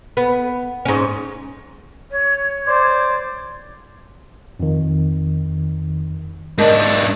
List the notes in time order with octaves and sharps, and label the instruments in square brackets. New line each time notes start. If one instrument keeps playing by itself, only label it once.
[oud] B3
G#2 C#4
[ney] C#5
[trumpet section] C5 D5
[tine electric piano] F2 D#3
[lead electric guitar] G#2 D4 [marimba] A#4 D#5 A5